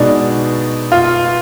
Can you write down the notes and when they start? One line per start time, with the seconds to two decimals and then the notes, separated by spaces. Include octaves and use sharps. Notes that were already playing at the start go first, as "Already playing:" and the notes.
Already playing: B2 G#3 B3 D4 D#4 F#4
0.92 F4